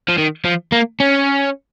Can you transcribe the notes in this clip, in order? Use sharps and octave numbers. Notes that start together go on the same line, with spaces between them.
F3
D#3
F3
A#3
C#4